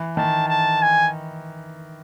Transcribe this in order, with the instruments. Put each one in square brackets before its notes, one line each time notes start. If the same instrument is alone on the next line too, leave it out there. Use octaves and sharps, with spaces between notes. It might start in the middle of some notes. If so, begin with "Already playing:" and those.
Already playing: [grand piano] E3
[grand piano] D#3 [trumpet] A5
[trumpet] A5
G#5